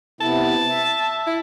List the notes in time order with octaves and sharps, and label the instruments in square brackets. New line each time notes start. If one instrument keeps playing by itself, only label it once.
[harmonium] C3 B3 E4 [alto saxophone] A5
[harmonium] E5
[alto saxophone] E4